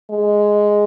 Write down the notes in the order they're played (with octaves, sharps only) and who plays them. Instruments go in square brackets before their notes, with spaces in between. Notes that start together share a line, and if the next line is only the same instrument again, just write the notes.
[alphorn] G#3